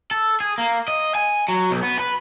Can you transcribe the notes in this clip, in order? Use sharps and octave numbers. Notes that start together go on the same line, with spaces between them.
A4
G#4
A#3
D#5
G#5
F#3
B1
B3
B4